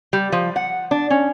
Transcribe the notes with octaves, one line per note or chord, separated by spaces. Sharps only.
G3
F3
F#5
D4
C#4